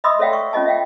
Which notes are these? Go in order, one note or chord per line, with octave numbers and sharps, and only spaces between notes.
D#5 E5 B5 C6 D#6 E6
A4 C#5 D5 E5 F5 G5
C#6
C#4 F4 D#5 A5
E5 F5 G5